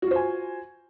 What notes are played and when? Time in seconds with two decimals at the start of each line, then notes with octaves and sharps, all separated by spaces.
0.02 F#4
0.07 F4
0.11 C5
0.15 G#5